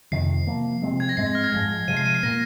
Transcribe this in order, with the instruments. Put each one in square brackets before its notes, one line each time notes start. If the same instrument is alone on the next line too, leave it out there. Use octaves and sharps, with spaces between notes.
[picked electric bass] F2 C3 D#3 [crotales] C7
[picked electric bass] C3 F3 A#3
C3 F3 G#3 C4
[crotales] G#6
A#6
[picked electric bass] G#2 G#3 C4 [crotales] C7
[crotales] A#6
F6
G#6
[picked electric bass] G#2 F3 G#3 [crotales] A#6
[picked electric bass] C3 F3 G#3 [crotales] D#7
[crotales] C7
D#7
C7
[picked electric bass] A#2 A#3 [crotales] A#6